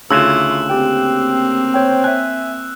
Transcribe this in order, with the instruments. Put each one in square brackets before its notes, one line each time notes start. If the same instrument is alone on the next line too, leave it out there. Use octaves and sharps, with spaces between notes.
[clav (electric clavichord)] D2 C#3 [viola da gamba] E4 F4 [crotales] E6 F#6 E7
[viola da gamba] A#3 C4 [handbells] G4 G5
[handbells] C5 C#5 G5
[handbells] E5 G#5 [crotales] F#6